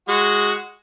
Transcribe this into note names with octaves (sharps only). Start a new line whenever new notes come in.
G#3 F#4